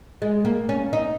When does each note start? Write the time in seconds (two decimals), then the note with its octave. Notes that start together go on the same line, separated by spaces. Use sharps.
0.22 G#3
0.45 A#3
0.69 C#4
0.93 D#4